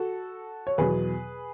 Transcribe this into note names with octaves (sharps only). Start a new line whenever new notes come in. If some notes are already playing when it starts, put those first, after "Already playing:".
Already playing: F#4 A4
C#5
E2 B2 F#3 G#4 B4